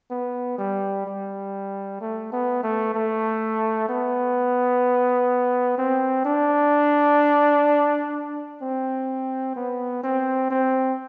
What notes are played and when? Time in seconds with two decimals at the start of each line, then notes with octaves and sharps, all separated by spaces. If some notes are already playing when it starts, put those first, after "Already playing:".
0.11 B3
0.58 G3
1.06 G3
2.01 A3
2.32 B3
2.63 A3
2.95 A3
3.89 B3
5.78 C4
6.25 D4
8.62 C4
9.56 B3
10.04 C4
10.50 C4